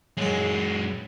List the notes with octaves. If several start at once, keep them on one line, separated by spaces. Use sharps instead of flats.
F#2 F#3 G#3 G#4